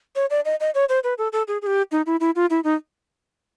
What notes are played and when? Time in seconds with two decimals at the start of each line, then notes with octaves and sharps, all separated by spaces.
0.16 C#5
0.30 D5
0.45 D#5
0.60 D#5
0.75 C#5
0.89 C5
1.04 B4
1.18 A4
1.33 A4
1.48 G#4
1.62 G#4
1.67 G4
1.92 D#4
2.06 E4
2.20 E4
2.36 F4
2.50 E4
2.64 D#4